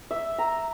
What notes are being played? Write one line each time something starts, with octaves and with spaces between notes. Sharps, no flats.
E5
A#5